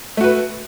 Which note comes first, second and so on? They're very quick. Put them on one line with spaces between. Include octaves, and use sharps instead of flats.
A3 F#4 B4